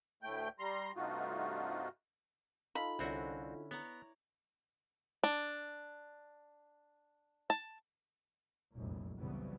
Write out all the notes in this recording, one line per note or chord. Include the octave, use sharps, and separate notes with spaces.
D2 A2 A3 G5 G6
G3 A#5 C6
G2 C3 A3 D#4 F4 F#4
D#4 F4 A4 B5
C2 D3 C4 C#4 E4 F#4
B3 C#5 D5 A#5
D4
A5
F1 C2 F#2 A#2
C2 C#3 E3 F#3 G3 B3